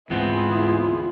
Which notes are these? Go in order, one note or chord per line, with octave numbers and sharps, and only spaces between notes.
D2 G#2 E3 B3 C4 E4 F4 G#4